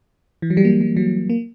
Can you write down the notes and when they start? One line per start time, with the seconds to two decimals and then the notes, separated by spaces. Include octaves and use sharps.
0.42 E3
0.50 F#3
0.57 G3
0.65 A#3
0.81 G3
0.97 F#3
1.30 A#3